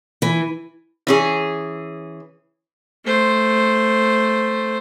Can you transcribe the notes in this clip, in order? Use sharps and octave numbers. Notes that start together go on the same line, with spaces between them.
E3
E3 C#4 G#4
A3 C5